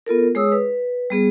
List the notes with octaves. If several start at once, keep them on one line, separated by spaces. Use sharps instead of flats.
B3 F4 A4 A#4
G#3 G#4 C#5 D#6 E6
B4
G3 B3 G#4